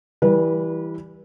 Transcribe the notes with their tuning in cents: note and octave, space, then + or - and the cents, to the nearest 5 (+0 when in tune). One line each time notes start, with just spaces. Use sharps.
E3 +0 G3 +0 B4 -35